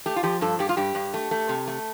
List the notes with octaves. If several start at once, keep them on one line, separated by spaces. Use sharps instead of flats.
A3 G4
F4
F3 G4
G2 A4
G2 G4
F4
G2 G4
G2
A3
A3
C3
A3